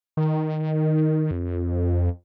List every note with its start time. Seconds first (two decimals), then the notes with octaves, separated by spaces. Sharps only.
0.17 D#3
1.31 F2